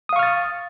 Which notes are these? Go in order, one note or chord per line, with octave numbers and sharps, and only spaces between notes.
F5 C#6 D#6 F6 A6